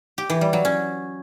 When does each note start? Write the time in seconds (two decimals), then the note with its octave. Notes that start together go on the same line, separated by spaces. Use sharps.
0.18 G4
0.30 E3
0.41 G3
0.53 F#3
0.65 C#4